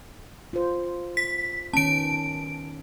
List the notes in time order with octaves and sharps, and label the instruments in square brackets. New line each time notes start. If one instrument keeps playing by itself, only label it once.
[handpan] F4 C5
[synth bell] B6
[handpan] D#3 B3 C#4 [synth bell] A5 D7